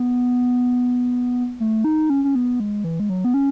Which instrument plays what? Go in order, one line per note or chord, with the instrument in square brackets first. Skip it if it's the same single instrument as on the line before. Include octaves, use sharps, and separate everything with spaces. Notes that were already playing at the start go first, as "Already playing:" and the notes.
Already playing: [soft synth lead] B3
A3
D#4
C#4
C#4
B3
G#3
E3
G#3
F#3
B3
C#4